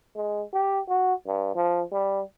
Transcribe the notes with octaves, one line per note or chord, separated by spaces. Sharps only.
G#3
G4
F#4
G2
F3
G3